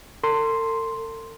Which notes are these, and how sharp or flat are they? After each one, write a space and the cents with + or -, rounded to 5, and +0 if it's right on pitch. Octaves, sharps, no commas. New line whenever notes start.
A4 +45 C6 +0